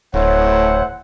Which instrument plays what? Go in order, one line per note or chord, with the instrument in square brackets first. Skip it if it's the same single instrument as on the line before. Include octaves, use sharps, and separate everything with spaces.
[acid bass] D1 [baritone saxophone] A2 [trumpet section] C5 E5 F#5 [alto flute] C#5